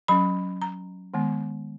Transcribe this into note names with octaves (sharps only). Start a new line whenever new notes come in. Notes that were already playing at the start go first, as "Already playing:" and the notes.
F#3 C#4 B5
A#5
D#3 G#3 B3